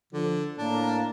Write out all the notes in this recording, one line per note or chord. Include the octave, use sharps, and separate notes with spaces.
D3 F3
A2 A#3 D4